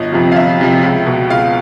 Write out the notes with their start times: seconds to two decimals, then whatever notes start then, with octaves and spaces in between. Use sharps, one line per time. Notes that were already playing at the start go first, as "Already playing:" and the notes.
Already playing: G1 D#5
0.12 F2 C3 F3
0.32 F5
0.36 G1 E5
0.60 F2 C3 F3
0.83 C#2
1.07 B2
1.29 C#2 F5